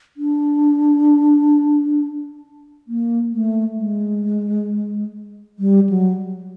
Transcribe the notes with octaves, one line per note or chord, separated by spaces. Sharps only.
D4
A#3
A3
G#3
G3
F#3